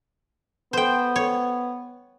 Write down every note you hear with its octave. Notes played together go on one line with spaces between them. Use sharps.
B3 C5 G5
C#5